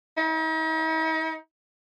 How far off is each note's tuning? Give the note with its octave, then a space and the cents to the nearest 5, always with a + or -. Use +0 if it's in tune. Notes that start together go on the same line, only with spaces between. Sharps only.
D#4 +45